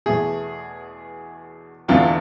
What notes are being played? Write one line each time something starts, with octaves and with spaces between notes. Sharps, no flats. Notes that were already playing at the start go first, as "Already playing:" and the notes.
E2 B2 A3 G#4
E1 E2 D3 A3 F4